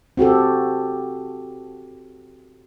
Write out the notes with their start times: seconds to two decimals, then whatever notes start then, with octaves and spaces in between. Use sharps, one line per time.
0.17 C4 F#4 G4 A4